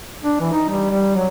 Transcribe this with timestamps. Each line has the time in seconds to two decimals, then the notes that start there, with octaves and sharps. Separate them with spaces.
0.24 D4
0.41 E3
0.52 D#4
0.70 G3
0.90 G3
1.15 F#3